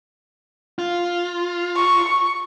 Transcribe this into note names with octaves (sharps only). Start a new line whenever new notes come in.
F4
C#6